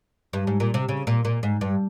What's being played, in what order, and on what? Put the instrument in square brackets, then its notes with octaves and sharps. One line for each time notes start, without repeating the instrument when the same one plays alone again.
[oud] G2
G#2
A#2
C3
C#3
A#2
A#2
G#2
G2